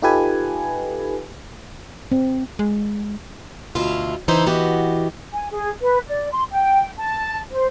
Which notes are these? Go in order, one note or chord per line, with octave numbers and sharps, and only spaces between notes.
D#4 F4 G4 A4 B4 G#5
C4
G#3
D2 B2 E4 F4 F5
C#3 E3 D#4 E4 C5
E3 B3 F#4 G4 D#5
G#5
G#4
B4
D5
C6
G5
A5
C5